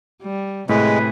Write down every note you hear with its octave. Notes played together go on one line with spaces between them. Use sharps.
G3
A2 C3 G#3 G#4 B4